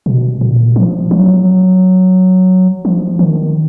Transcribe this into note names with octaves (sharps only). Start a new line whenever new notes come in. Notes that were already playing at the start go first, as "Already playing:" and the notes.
B2
A#2
F3
F#3
F3
D#3